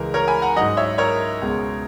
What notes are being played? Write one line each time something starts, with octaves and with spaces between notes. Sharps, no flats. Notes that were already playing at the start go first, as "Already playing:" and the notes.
Already playing: C#2 C#3 E3 G#3 A#4
A#4 C#5
G#5 B5
F#5 A#5
G#2 F#3 D#5 F#5
C#5 E5
A#4 C#5
C#2 B2 G#3